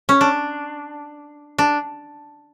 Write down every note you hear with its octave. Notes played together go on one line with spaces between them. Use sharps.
C#4
D4
D4